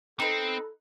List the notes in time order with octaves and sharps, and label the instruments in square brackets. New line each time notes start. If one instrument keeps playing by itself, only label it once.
[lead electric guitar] C4 [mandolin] D#4 B4 [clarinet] A4